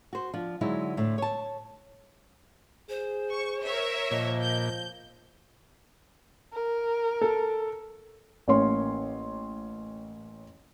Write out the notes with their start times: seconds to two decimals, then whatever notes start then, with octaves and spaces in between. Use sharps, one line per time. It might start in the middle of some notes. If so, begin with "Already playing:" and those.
0.13 F#4 C5
0.34 F3 D4
0.61 D3 F#3 G#3 D#4 E4
0.97 A2 D3
1.18 C#5 A5
2.89 G#4 C5
3.30 C#6
3.64 A#4 C#5 E5
4.11 A#2 F3 D#5
4.41 G6
6.53 A#4
7.22 A4
8.48 A1 A#3 C#4 C#5 C6